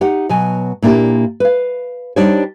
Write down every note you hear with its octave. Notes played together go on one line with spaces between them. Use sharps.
D#4 G4 F#5
B2 F#3 G#5
A#2 A#3 D4 E4 G4
B4 F5
G3 D4 D#4 G4 C5 C#5